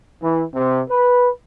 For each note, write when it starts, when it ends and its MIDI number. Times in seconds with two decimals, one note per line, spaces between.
0.22 0.42 52
0.54 0.82 48
0.89 1.29 71